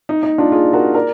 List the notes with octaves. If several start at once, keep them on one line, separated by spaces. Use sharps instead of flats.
D#4
D#4
D4 F4
F4 G#4
F#4 A#4
A#4 D5